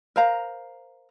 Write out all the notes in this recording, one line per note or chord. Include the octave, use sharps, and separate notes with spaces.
A#4 C5 F5 A#5